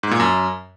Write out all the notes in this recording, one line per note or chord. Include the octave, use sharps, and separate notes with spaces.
G#2
A#2
F#2